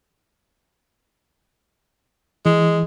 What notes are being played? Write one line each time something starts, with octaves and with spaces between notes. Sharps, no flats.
E3 G#3